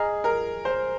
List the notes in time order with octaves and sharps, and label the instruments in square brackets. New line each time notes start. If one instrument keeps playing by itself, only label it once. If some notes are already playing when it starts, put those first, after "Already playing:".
Already playing: [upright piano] G#4 [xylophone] D#5 A#5 F6
[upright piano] A#4
C5